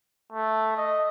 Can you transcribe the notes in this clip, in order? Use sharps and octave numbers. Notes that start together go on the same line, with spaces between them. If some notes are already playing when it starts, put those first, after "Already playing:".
A3
D#5